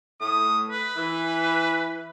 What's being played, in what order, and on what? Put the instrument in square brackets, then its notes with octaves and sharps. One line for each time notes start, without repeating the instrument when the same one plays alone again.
[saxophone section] A2 A3 [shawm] D#6
[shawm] B4
[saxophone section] E3